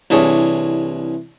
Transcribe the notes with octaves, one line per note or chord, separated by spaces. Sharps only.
C2 E3 D4 G#4 C#5